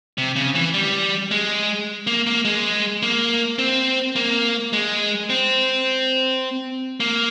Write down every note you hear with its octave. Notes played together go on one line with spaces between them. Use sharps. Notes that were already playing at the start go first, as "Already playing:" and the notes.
C3
C#3
E3
G3
G#3
A#3
A#3
G#3
A#3
C4
A#3
G#3
C4
A#3